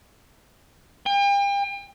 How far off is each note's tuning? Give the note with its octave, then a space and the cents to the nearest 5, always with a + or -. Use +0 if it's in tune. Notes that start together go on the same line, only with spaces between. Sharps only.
G5 +40